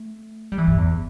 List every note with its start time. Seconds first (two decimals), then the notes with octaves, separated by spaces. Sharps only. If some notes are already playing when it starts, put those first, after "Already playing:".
Already playing: A3
0.52 G3
0.58 E3
0.67 G2
0.78 E2